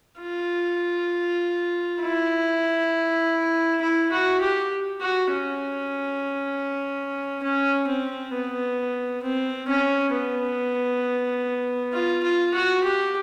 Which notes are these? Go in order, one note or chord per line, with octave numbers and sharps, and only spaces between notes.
F4
E4
E4
F#4
G4
F#4
C#4
C#4
C4
B3
C4
C#4
B3
F4
F4
F#4
G4